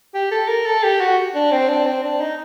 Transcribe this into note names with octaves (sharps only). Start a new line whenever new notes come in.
G4
A4
A#4
A4
G4
F#4
D4
C4
D4
C4
D4
D#4